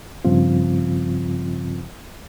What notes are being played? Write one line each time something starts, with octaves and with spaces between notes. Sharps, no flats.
G2 C#3 F3 C4 F4